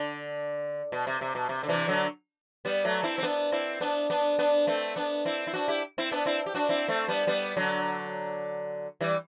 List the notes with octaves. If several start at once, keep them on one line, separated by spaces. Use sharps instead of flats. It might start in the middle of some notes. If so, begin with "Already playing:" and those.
Already playing: D3
B2
C3
C3
B2
C3
D3
C3 E3
D3 F#3
G3 B3
F#3 A3
C4 E4
C4
B3 D4
C4 E4
B3 D4
B3 D4
B3 D4
A3 C4
B3 D4
C4 E4
E4
D4 F#4
E4 G4
C4 E4
B3 D4
C4 E4
G4
D4 F#4
C4 E4
A3 C4
G3 B3
G3 B3
D3 F#3
E3 G3